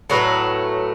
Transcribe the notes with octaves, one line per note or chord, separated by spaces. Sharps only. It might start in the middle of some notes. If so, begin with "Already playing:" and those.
A2 F#3 A3 B4